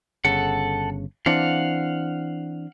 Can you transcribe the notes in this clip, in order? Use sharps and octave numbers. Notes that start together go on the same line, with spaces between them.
G1 C#3 A4 F#5
E3 C4 D4 F5 F#5